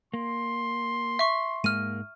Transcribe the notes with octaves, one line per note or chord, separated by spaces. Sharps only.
A#3 C6
E5 C#6
G#2 G#3 A#3 F6 D#7